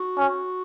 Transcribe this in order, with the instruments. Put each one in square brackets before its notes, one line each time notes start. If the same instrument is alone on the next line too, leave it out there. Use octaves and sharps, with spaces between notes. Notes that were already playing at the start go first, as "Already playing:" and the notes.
Already playing: [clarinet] F#4
[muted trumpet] C#4